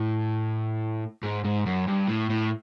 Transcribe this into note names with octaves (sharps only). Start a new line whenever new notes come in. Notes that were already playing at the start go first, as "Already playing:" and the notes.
Already playing: A2
G#2
G#2
F#2
G2
A2
A2